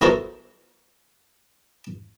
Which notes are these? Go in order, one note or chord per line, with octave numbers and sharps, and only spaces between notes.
B3 E4 F#4 A4 A#4 C5